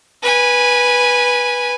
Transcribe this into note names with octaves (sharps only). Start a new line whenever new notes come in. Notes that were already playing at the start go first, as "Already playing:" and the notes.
B4 G#5